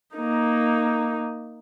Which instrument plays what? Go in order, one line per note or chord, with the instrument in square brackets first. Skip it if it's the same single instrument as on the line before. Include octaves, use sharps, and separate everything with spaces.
[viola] A#3 D#4